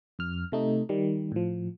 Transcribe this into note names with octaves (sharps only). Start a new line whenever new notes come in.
F2 F6
C3 A3 D#4
D#3 G3
A2 F3